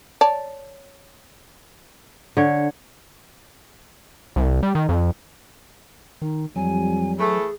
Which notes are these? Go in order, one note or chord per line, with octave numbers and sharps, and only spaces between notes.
C#5 D5 A5
D3 C#5
C2
G3
D#3
F2
D#3 D#4
F2 F#3 G3 G#5
E3 A3 G#4